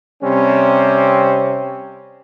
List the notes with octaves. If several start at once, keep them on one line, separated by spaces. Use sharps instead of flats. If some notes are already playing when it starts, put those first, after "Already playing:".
C3 G3 C4 C#4